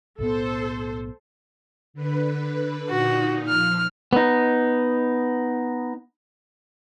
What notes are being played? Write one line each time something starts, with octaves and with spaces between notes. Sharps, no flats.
B1 A2 B3 A4 C5
D3 B4
A#2 D#4 F#4
F3 F6
B3 D#4